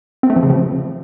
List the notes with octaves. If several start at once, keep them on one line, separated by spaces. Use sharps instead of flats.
C4
A3
F3
C#3
F3